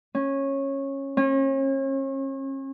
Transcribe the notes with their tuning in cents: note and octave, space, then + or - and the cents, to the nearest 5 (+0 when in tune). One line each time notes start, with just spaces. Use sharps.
C#4 -15
C#4 -40